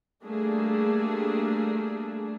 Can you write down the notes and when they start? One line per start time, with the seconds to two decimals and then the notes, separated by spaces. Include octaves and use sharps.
0.25 G3 A3 A#3 D4 G#4